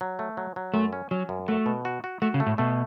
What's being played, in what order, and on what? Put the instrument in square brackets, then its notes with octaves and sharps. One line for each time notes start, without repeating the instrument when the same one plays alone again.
[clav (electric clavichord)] F#3
A3
F#3
F#3
[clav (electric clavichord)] F#2 [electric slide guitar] A3
[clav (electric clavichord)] C#4
[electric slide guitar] F#3 [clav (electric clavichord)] C#4
[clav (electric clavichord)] F#2
[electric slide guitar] A3 [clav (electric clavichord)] F#4
[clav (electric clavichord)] B2
F#4
F#4
[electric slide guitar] A3 [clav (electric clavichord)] F#4
[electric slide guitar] C#3
[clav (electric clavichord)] A3
[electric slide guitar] A2
[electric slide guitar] B2 [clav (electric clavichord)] A3